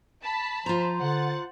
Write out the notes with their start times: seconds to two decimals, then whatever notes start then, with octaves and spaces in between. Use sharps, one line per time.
0.23 A5 B5
0.66 F3 F4 C5 A#5
1.01 D3 F#5 A6